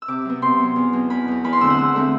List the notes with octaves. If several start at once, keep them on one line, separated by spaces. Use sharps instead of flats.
E6
C3 D6
F#3 B3
C3 C6
F#3 B3
E2
B2 F#3
E2 B5
B2 F#3
E2 B5
C6
D3 A3 C4 E6
F#5
E2 E6
D3 A3 C4